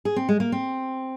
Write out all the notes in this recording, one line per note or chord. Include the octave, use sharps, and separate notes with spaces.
G#4
C4
G#3
A#3
C4